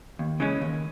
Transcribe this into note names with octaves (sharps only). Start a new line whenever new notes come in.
D#2
C#3 E3 G#3 C#4
D#2